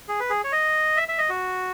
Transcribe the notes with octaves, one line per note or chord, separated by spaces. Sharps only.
G#4
B4
G#4
C#5
D#5
E5
E5
D#5
F#4